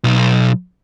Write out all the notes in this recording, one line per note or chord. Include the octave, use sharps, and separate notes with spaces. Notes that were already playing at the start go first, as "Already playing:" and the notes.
B1